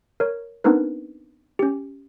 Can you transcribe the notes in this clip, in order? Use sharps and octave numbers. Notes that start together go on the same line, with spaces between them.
A#4 C#5
B3 C4 D4 D#4 A#4 B4
C#4 G4